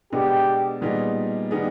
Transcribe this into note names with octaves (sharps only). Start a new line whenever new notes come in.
B2 G#3 B3 D4 G4
A#2 G3 B3 D#4 G#4
D#3 G3 B3 D#4 G#4